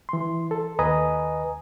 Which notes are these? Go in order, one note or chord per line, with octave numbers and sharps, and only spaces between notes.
E3 C6
A4
D#2 B4 D#5 G#5 A#5 D#6